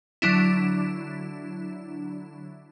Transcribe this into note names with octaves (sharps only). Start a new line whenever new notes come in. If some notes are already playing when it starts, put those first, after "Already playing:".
D3 F#3 D4 E4